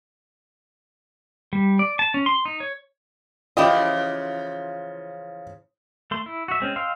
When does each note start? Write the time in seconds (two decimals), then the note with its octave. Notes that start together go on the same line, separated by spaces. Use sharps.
1.53 G3
1.79 D5
1.99 A5
2.14 C#4
2.26 C6
2.45 D#4
2.60 C#5
3.57 C#3 E3 F3 E4 F4 G4 D#5
6.11 A3 C6
6.26 E4
6.48 F#4 E5
6.60 G#3 C4 C#4
6.76 D#5 F5 G5 C6 E6